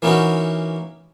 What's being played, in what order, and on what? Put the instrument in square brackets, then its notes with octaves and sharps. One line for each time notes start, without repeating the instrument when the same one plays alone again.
[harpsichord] E3 A#3 B3 C#4 D#4 F#4